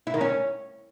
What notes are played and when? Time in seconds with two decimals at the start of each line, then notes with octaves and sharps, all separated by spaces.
0.07 E4
0.14 D#3
0.21 C#4